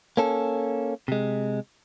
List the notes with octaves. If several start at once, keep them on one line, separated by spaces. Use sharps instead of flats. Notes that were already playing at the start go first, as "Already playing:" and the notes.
A#3 C#4 A4
C3 G#3